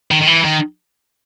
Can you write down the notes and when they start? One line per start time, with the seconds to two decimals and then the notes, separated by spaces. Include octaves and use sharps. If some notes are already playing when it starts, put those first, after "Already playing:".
0.11 D#3
0.22 D#3
0.27 E3
0.45 D#3